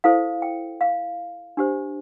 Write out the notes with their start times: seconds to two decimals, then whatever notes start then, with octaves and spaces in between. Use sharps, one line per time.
0.04 E4 A4 C5 F5
0.42 G5
0.81 F5
1.57 D4 G4 C5